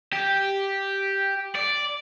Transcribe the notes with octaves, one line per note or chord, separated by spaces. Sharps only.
G4
D5